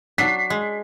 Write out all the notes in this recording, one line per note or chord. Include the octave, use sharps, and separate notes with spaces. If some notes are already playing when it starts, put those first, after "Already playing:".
F#3 D4 B6 C7
G#3